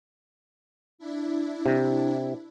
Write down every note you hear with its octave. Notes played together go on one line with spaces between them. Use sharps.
D4 E4
C3